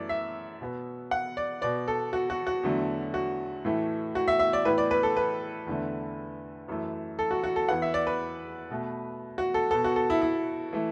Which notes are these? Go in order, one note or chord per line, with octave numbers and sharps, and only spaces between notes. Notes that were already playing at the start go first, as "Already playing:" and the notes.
Already playing: F#2 E3 A3 D5
E5
B2 B3
F#5
D5
B2 B3 D5
A4
F#4
F#4
F#4
E2 D3 F#3 A3
F#4
A2 E3 A3
F#4
E5
E5
D5
A2 E3 B3 B4
D5
B4
A4
B4
E2 D3 A3
F#2 E3 A3
A4
F#4
F#4
A4
E2 E3 B3 F#5
E5
D5
B4
B2 A3
F#4
A4
B2 B3 A4
F#4
A4
E4
E4
E3 A3